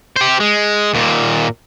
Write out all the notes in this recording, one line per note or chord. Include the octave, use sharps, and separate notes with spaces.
G4 C5
G#3
D#2 A#2